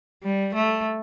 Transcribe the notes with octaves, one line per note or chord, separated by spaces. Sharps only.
G3
A3